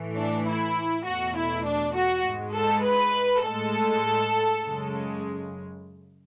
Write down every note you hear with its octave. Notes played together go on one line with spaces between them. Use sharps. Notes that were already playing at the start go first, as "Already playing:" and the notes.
Already playing: A2 E3 A3
D4
E4
E2 B2 A3 F#4
E4
D4
F#4
G#2 G#3
A4
B4
A2 G#3 A4
F#2 C#3 G#3